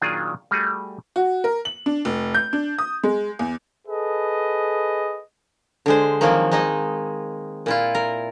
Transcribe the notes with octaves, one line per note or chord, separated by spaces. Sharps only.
A#2 D#3 F#3 D4 F4 G#4
G3 A3 F#4 G#4
F#4
A#4
F#7
D4
F1
G6
D4
D#6
G#3
E2
G#4 A4 B4 D#5
D3 G#3 C5
D#3 F3 F#3 G#3 A#3 C4
G#3 D#4 D#5
A#2 E4 F4
A#4